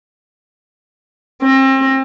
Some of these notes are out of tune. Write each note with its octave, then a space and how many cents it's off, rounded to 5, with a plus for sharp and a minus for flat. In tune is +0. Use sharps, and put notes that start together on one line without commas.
C4 +35